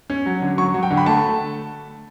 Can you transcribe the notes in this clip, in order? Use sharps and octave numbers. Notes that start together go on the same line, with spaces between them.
C#4
F#3
D3
F#3 C#6
F#3
G5
D3
B5
A3 A5